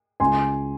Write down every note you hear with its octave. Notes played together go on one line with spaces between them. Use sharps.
C#2 G#5 C6